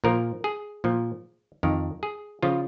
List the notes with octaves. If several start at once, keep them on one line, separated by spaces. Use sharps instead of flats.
A#2 F3 A#4
G#4
A#2 F3
F2 D#3 A#4
G#4
C#3 F3 F4